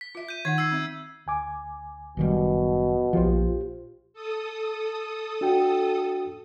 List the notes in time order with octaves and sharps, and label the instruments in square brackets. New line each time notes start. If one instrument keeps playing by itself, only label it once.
[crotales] B6
[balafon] F4 E5
[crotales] G6 D#7
[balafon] D#3 D#4 F#5 [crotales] G#6
[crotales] E6 G#6 C7
[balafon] C4 E5
[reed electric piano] D2 G#5 D6
[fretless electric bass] F#1 D#3 G3 [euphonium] B2
[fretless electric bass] A#1 F3 [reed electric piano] F4 G4 C5
[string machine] A4 D#6
[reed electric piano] D4 F#4 G5